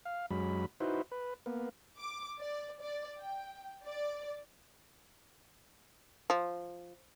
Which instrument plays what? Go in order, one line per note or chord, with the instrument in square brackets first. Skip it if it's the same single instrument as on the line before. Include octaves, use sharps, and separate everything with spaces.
[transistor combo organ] F5
F#2 F#3 G#3 B5
D#4 E4 F#4 B4 C5
B4
A#3 B3
[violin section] D6
D5
D5
G5
D5
[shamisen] F3